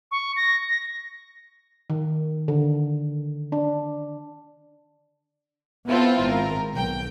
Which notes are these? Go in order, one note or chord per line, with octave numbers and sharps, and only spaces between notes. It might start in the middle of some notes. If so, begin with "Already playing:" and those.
C#6
A#6
A#6
D#3
D3
D4
B3 C4 E4 F4 A4
G#1 A#4
B1 G5